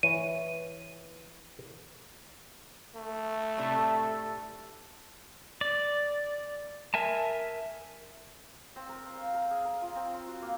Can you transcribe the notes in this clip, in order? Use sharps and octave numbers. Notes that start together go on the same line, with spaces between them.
E3 C#5 D#7
A3
A2 C3 D4 A4
D5
A#4 E5 G#5 A5
C4
A#4
C5
F5
A#4
G#4
A#4
F4
C4
C6
F#4
A#3